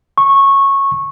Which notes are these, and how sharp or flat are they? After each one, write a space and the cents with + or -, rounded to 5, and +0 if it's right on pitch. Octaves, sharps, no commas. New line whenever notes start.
C#6 -15